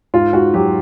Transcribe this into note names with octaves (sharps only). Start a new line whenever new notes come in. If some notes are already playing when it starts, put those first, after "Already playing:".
G#2 F4
G#2 F#4
F#3 G4